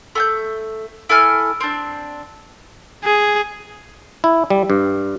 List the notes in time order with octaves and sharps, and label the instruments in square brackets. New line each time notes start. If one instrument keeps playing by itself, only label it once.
[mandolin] A3 G#5 G6
E4 A4 G#5 F6
C4 D4
[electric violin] G#4
[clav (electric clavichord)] E4
G3
G2